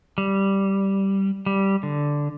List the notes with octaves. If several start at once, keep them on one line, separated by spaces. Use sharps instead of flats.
G3
G3
D3